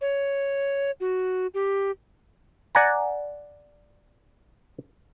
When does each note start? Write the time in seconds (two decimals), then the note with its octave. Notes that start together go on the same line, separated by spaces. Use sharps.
0.01 C#5
1.00 F#4
1.54 G4
2.75 D5 F#5 G#5 A#5